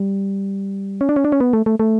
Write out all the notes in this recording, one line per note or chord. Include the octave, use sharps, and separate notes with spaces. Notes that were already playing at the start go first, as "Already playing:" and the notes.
Already playing: G3
C#4
D4
C#4
D4
C#4
B3
A3
A3
A3